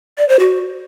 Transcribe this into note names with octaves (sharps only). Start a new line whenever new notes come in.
D5
C5
F#4